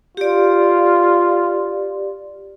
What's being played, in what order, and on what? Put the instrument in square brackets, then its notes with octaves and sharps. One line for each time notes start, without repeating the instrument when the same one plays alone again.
[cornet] F4 [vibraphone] G4 D5